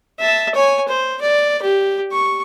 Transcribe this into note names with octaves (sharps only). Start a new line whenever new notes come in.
E5 A5
C#5 G#5
C5
D5
G4
C#6